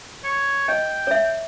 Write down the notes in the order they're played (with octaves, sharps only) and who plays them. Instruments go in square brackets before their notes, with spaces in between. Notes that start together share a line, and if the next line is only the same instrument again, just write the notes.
[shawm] C#5
[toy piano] D#5 [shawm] G5
[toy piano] C#5 E5